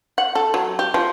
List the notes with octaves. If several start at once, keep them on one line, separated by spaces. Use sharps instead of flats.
F#5
A4
F#3
G4
F3